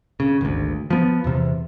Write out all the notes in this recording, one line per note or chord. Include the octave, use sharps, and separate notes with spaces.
C#3
G#1 D2
F3 B3
E2 C3